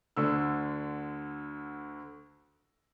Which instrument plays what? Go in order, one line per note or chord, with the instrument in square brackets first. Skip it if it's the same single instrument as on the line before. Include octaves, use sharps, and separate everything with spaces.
[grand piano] D2 D3 E6